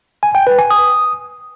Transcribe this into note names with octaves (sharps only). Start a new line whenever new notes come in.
G#5
G5
B4
G#5
D#6